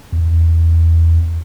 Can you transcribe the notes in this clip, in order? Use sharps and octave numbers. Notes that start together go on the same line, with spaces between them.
E2